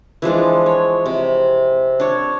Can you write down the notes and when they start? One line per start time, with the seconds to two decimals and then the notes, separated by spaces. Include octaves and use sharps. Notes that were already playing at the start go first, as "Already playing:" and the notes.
0.22 E3 F3 G#3 D4
0.66 C#5
1.06 C3
2.00 D4 C#5